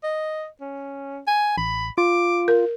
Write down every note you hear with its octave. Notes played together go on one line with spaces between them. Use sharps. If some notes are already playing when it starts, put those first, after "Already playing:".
D#5
C#4
G#5
A1 B5
F4 D6
A#4